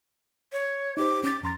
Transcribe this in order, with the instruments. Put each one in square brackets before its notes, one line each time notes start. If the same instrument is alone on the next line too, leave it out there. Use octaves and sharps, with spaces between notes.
[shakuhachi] C#5
[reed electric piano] D#4 G4 C5 [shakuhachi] D6
[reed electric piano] C#4 A6 [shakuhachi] D6
[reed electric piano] F2 C6 A6 [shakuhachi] A#5